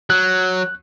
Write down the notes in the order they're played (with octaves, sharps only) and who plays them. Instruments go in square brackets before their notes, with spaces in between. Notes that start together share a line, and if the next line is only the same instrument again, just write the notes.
[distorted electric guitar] F#3 [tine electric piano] F#6